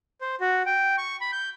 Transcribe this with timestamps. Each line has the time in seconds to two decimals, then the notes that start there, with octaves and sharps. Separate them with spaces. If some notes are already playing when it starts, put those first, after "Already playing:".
0.21 C5
0.41 F#4
0.66 G5
0.98 C#6
1.21 B5
1.32 G6